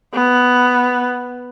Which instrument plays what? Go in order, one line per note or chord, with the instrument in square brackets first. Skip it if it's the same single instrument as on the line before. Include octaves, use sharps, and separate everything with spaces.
[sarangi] B3